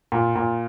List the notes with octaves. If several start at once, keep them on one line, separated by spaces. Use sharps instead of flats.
A#2
A#2